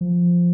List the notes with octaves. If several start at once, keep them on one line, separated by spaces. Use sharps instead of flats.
F3